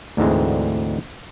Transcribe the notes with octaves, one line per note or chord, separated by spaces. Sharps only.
D2 G#2 D3 E3 G#3 C4